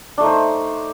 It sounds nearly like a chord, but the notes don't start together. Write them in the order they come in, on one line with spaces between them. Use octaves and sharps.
D4 A3 D#4 C5